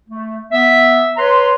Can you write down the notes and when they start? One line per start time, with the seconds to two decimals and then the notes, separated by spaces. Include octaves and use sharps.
0.09 A3
0.52 B3 E5
1.17 B4 C#5 A#5 C6